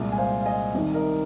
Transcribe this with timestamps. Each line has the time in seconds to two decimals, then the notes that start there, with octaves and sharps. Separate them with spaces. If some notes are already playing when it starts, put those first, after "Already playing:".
Already playing: C2 A#2 G#3
0.12 G#5
0.18 C5 F5
0.42 F5
0.45 D#5 G#5
0.74 C2 C3 D#3
0.94 A#4 D#5